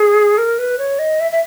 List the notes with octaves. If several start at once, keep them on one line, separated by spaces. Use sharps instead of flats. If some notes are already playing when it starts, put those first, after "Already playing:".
Already playing: G#4
A#4
B4
C#5
D#5
E5
E5